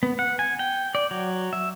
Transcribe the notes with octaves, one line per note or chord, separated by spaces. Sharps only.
B3
F#5
G#5
G5
D5
F#3
E5